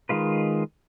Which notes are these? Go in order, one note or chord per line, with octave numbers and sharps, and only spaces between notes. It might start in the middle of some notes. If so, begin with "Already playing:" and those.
D#3 G#3 F4 B4